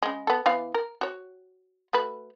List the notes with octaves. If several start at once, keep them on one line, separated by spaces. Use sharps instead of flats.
C#3 G#3
B3 A4
E3 B3 F5
A#4
F#4 C#5
A3 F#4 B4